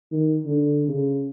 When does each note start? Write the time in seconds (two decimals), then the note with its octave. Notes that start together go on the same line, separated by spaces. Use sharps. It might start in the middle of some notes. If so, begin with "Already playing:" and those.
0.12 D#3
0.46 D3
0.88 C#3